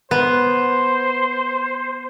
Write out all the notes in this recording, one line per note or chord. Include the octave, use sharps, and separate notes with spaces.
B3 C5